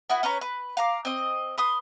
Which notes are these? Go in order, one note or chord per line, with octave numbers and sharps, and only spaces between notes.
B3 E4 F#4
C#4 B4 C#5 A#5
B4
F5 A#5 D6
C4 D#5
B4 C6 D#6